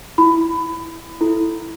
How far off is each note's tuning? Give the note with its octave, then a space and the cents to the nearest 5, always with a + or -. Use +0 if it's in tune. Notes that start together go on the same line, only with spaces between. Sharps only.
E4 +0 B5 +20
E4 +0 A4 +0